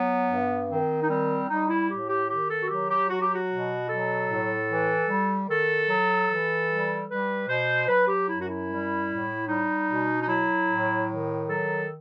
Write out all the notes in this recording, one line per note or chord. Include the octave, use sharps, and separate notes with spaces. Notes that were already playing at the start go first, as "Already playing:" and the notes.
Already playing: F#3 B3
G2
D#3 C4
D#4
G3 C4
G3 D#4
E4
A2 G4
G4
D#3 G4
A4
F#4
F#3 G4
G4
F#3 F#4
G4
F#4
B2
F#3 A4
A2
E3
G3
D#3 A4
F#3
E3
G3
G3 B4
B2 C5
F#3 B4
G4
F#2 E4
F#4
E4
G3
A2
G3 D#4
B2
D#4
F#3 E4
A2
D#3
F#3 A4